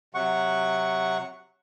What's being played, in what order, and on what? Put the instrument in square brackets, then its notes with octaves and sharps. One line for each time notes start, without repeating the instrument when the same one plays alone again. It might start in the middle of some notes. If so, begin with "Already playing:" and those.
[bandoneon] C3 F#3 F#5 C#6